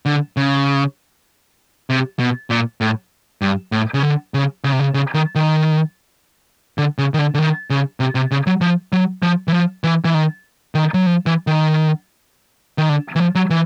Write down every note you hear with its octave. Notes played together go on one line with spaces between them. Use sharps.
D3
C#3
C3
B2
A#2
A2
G2
A2
C#3
D3
C#3
C#3
C3
C#3
C#3
D#3
D#3
D3
C#3
D#3
D3
D3
D#3
C#3
C3
C3
C#3
F#3
F3
F#3
F3
E3
F3
E3
E3
D#3
D#3
F#3
F3
E3
D#3
D#3
D3
E3
F3
F#3
E3